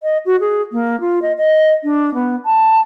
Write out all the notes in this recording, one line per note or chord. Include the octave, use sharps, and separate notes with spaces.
D#5
F#4
G#4
A#3
F4
D#5
D#5
D4
B3
A5